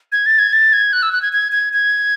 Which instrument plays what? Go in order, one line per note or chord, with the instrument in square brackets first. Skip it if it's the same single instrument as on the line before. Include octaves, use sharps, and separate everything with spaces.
[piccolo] G#6
A6
G#6
A6
G#6
F#6
E6
F#6
G#6
G#6
G#6
G#6